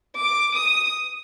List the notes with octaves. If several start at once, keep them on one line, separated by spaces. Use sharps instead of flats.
D6
D#6